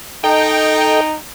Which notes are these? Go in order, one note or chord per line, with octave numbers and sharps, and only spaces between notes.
D#4 A4 D#5 G5